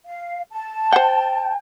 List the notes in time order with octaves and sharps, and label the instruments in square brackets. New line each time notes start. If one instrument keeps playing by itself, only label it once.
[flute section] F5
A5
[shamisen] C5 F#5 [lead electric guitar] G5